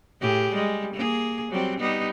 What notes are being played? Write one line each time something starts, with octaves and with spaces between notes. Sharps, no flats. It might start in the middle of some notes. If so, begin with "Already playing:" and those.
A2 G4 G#4
G3 G#3
A#3 G#4
F#3 G3 C4
G3 B3 D#4